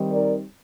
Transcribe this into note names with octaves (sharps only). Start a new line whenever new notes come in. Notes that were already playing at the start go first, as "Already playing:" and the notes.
Already playing: D#3 G3 C4 D#4
A#4 D5